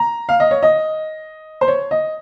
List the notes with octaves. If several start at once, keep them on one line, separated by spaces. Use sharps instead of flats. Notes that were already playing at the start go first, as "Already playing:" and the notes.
Already playing: A#5
F5
D#5
C#5
D#5
C5
C#5
D#5